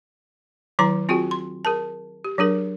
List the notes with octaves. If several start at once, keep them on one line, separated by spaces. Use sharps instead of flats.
D#3 F#3 E4 A#5 C6 D6
C4 F4 F#4 G#4 G5
C6
G#4 A#4 A5
G4
F#3 D4 G#4 A#4